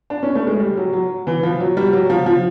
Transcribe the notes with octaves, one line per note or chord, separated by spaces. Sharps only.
D4
C#4
A3
G#3
G3
F#3
F#3
E3
F3
F#3
G3
F#3
F3
F3